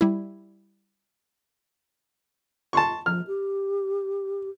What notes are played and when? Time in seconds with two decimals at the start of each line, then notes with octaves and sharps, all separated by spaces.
0.01 G3 E4
2.73 A5 C6 C#6
3.06 F3 F6
3.27 G4